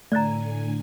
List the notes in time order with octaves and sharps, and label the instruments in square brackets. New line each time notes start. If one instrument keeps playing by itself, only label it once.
[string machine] A2 D3 G#5 [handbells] A3 F#6 A6 [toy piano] D5 A#5